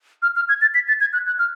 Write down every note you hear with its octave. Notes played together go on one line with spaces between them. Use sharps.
F6
F6
G#6
A6
B6
A6
G#6
F#6
F#6
F6